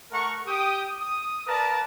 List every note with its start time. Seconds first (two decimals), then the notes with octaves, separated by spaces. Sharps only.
0.11 A3 A#4 F#5 A#5 C#6
0.46 G4 G5 D#6
0.99 D#6
1.47 A#4 B4 D5 F5 A5 A#5